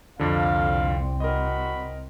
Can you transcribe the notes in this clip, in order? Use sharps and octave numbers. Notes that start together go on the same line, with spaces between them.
C2 F2 D3 C4 F5
F#4 A#4 D#5 B5